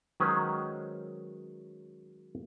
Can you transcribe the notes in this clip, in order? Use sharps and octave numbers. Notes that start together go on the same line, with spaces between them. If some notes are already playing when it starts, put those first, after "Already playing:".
D#3 F#3 G#3 C#4 B4 C5